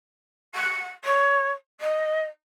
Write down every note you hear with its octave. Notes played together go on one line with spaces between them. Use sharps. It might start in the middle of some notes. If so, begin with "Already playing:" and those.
F#5
C#5
D#5